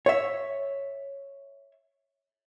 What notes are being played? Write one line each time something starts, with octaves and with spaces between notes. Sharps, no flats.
C#5 E5